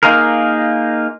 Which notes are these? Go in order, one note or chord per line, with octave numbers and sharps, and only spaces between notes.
A#3 D#4 F4 G#4 A#4